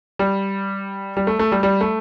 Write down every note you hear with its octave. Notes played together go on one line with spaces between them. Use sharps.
G3
G3
A3
A3
G3
G3
A3